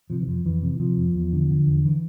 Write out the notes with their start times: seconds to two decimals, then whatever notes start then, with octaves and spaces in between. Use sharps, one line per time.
0.10 C3 F3
0.21 E3
0.27 F2 F3
0.45 F2 E3
0.63 C3
0.79 C3 F3
0.97 F2
1.14 E2
1.33 D3
1.50 D3
1.67 E2
1.85 E3